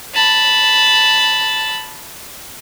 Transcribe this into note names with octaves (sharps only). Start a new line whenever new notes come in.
A5 B5